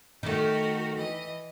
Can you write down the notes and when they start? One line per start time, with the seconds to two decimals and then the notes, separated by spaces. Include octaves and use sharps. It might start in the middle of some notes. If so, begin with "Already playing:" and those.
0.23 D#3 A3 F#4 G4 A#4
0.96 E3 D#5